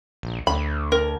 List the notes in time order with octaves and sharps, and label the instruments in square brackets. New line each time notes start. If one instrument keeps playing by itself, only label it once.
[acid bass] A#1
[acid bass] D2 [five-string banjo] B5
[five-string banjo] A#4